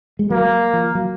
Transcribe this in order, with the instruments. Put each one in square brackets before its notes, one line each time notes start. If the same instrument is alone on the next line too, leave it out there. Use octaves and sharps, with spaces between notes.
[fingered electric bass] G#3
[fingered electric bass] F#3 [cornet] A#3
[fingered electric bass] F3
F#3